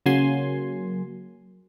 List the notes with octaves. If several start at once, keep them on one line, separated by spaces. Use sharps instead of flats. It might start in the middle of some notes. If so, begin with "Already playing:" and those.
C#3 F#3 A#3 G#5 C6